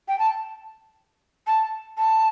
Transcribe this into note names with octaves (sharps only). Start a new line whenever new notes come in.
G5
A5
A5
A5